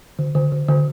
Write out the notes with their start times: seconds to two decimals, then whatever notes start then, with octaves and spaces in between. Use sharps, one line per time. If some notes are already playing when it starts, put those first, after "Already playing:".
0.19 D3
0.35 D3
0.52 D3
0.69 D3